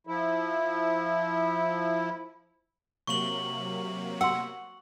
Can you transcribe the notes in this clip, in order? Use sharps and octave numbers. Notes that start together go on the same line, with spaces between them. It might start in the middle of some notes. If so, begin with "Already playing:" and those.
F3 E4
C3 F#3 A#3 C#6 F#7
F#4 F#5 E6